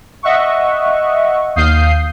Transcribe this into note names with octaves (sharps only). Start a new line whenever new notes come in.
D#5 E5 F#5 C#6
D#2 F5 D#6 G6 C7